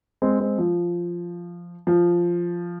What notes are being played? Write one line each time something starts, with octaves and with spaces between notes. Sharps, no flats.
G#3 C4
G#3 C4
F3
F3